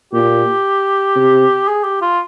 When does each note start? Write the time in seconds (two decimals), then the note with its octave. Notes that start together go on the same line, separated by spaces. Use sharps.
0.13 A#2 G4
1.16 C3
1.68 G#4
1.84 G4
2.01 F4